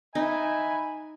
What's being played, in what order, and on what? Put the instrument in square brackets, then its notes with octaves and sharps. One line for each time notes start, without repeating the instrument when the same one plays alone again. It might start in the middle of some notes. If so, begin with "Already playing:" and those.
[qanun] D#4 [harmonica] E5 G#5 B5